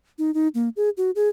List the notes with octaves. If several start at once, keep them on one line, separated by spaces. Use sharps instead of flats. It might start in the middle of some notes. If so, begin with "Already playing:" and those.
D#4
D#4
A#3
G#4
F#4
G#4